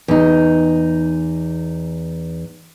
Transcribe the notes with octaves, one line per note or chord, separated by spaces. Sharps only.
E2 D#4